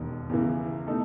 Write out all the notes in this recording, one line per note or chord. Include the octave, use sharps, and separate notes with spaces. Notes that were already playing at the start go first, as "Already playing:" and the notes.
Already playing: E1 D#2 D#3
E2 C#3 E3
B2 A3 D#4 A4